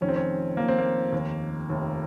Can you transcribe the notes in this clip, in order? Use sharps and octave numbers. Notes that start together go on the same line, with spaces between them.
F1 F2 D#3 C#4
C4
C#4
F1 F2 D#3 A#3
C4
A#3
F1 D#2 D#3
F1 D#2 D#3